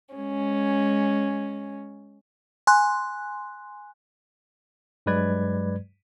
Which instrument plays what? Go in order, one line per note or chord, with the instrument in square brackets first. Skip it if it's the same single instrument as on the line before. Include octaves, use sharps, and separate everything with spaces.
[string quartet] G#3 C#4
[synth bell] G#5 C6 F#6
[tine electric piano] G2 F#3 G#3 B4 D5 G#6